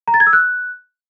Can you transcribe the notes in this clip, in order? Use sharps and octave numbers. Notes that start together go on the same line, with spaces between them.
A#5
A6
G#6
E6
F#6